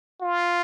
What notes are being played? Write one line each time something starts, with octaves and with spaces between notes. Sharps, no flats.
F4